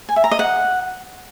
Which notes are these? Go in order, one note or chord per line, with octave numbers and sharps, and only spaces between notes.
G#5
E5
A#5
D#5
F#5